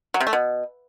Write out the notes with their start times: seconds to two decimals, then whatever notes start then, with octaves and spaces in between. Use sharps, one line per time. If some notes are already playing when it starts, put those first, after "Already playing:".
0.14 F#3
0.20 C3
0.27 A3
0.33 B2